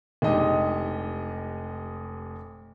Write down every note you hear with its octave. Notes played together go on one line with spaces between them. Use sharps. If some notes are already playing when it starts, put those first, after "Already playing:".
F1 G#3 D4 D#4 G4 D#5